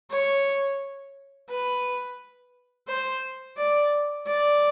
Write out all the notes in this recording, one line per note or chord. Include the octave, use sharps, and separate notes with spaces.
C#5
B4
C5
D5
D5